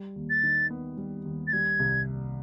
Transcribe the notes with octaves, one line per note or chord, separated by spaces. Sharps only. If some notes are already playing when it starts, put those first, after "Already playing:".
Already playing: G3
D#2
A6
D#3
B3
G3
D#2
A6
G3 G#6
C2